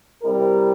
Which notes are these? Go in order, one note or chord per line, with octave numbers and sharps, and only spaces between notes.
C3 G3 C4 E4 A#4